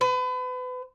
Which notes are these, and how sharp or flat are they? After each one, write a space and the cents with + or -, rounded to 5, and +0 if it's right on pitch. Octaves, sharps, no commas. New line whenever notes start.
B4 +35